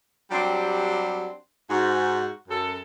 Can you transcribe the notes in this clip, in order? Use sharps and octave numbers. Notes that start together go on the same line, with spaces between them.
F#3 G3 C4 D4 G4
G#2 F#4
F#2 A4